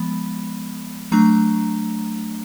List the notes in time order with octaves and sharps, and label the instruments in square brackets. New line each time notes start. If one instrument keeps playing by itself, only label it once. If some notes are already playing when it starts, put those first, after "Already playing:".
Already playing: [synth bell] F3 G#3 B3 B5
F#3 A3 D4 A#5